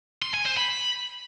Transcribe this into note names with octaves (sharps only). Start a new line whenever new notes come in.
C6
G#5
C5
B5